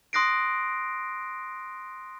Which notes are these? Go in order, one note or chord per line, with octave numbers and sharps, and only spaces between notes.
C6 D#6 F#6 A#6 C7 D7